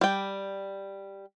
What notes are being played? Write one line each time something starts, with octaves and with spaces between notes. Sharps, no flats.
G3 G5